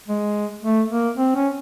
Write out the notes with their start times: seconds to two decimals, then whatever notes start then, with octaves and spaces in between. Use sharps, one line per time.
0.08 G#3
0.63 A3
0.90 A#3
1.18 C4
1.35 C#4